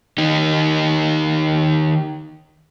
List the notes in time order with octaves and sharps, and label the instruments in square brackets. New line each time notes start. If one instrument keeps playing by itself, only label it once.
[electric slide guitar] D#3 D#4 G4